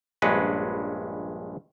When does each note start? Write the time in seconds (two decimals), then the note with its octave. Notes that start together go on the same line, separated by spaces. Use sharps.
0.22 A#1 G2 G#3 C#4 B4